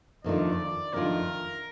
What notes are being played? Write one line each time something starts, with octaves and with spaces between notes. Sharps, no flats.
F2 D#3 A3 D4 F4 D5
F2 D#3 A3 D4 F4 A#4